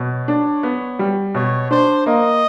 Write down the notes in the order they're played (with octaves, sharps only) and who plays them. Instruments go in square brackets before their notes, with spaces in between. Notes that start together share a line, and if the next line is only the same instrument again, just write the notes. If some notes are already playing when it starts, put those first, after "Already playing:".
Already playing: [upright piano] B2 [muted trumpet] C#5
[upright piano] D4
B3
G3
[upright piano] B2 [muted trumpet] C#5
[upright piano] D4 [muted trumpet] C5
[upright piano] A#3 [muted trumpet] D#5